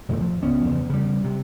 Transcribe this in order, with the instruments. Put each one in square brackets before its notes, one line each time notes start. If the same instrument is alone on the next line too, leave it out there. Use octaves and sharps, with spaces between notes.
[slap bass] E1 D#2 A2 A3
F3
C#2 B3 C#4
E2 C#3
C#3 G3
C3